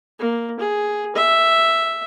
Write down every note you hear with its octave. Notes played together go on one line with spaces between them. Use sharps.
A#3
G#4
E5